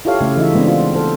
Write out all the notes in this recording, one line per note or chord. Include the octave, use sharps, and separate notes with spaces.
E4 F4 G4 A4 C#5 F5
C#3 A3
E3 D#4 F4 E5
G#3 A3 B3 C4 D4
F4
A4 C5 F5